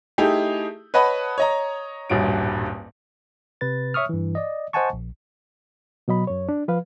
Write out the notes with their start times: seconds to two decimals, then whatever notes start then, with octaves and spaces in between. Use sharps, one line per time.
0.18 A3 D#4 E4 G4 G#4
0.94 B4 C#5 D#5 F#5 A5 B5
1.38 C#5 D#5 A#5
2.09 D#1 A1 G2 F#4 D7
3.61 C3 B4 A6
3.94 C#5 E5 C#6 D#6 F6
4.09 G2 E3
4.35 D5 D#5
4.73 C5 D#5 F#5 G#5 A5 C#6
4.93 A#1
6.08 B2 F#3 D#5 B5
6.27 F#2 C#5
6.49 D4
6.68 F3 B4 F5